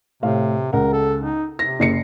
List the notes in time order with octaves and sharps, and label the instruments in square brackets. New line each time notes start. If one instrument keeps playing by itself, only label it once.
[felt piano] A2 F5 [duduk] C3
[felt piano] C#2 F#5 [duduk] A#4
[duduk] A4
D#4
[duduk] C3 [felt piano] A#6
[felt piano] F#1 C7 C#7